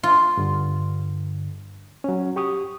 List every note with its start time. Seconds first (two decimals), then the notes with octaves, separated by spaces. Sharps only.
0.03 F4
0.37 G2 D3
2.04 F#3 C#4
2.36 G4 C#6 D#6